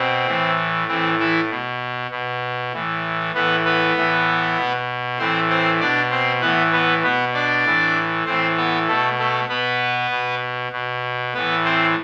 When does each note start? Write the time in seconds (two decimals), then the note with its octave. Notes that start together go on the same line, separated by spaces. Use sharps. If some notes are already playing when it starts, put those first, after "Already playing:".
Already playing: B2 C4
0.27 A2 E3
0.88 A2 E3 C4
1.19 E3 E4
1.50 B2
2.11 B2
2.73 A2 E3
3.34 A2 E3 B3 B4
3.65 B3 B4
3.95 A2 E3
4.57 B2
5.19 A2 E3 C4 C5
5.49 C4 C5
5.80 B2 D4 D5
6.11 C4 C5
6.41 A2 E3 B3 B4
6.72 B3 B4
7.03 B2 B3 B4
7.34 D4 D5
7.65 A2 E3
8.26 A2 E3 C4 C5
8.57 B3 B4
8.88 B2 A3 A4
9.19 A3 A4
9.49 B2 B3 B4
10.11 B2
10.72 B2
11.34 A2 E3 B3 B4
11.65 C4 C5